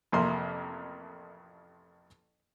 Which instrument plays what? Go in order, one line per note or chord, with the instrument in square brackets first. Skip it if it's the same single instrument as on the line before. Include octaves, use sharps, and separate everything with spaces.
[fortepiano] A1 F2 C3 A#3 C6